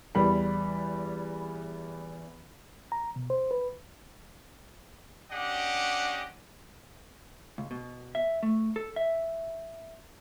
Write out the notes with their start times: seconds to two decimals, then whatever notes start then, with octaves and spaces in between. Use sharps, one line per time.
0.15 E2 G3 B5
2.92 A#5
3.16 B2
3.30 C5
3.51 B4
5.32 C#4 D4 G4 D#5 F#5
7.58 C#2
7.71 B2
8.15 E5
8.43 A3
8.76 A4
8.96 E5